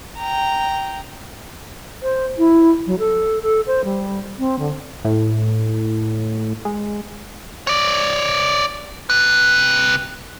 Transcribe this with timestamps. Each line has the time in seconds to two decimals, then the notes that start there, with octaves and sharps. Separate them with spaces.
0.19 G5 A#5
2.03 C5
2.38 E4
2.87 F#3
2.99 A4
3.43 A4
3.67 C5
3.84 G3
4.38 C4
4.59 D3
5.05 A2
6.65 G#3
7.67 C#5 D5
9.10 C3 B4